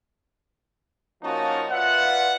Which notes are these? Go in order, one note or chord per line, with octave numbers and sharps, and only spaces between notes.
F3 A#3 C#4 D#4 F#4 A5
F4 B4 D5 E5 F#5